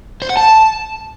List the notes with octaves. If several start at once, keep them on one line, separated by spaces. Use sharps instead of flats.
C5
F#5
A5